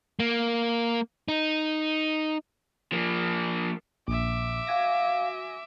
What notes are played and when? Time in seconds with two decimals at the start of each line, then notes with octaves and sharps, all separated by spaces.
0.20 A#3
1.28 D#4
2.92 F3 A#3
4.08 A#1 E5 D6
4.67 F#4 F5 G#5 A#6